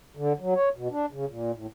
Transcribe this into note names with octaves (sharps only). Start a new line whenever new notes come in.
D3
F#3
C#5
B2
D4
C#3
A#2
A2